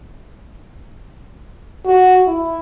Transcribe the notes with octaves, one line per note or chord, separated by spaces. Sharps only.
F#4
E4